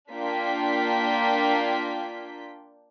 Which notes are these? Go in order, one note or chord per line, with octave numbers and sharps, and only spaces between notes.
A#3 D4 F4 G5 B6